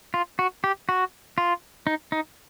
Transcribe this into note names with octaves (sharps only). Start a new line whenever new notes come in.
F4
F#4
G4
F#4
F4
D#4
D#4